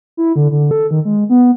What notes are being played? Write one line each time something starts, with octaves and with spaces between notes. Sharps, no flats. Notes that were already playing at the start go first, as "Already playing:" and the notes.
E4
D3
D3
A4
D#3
G#3
B3